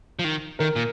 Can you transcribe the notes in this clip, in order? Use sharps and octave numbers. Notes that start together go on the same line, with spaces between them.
F3
D#3
D#3 A#4
A#2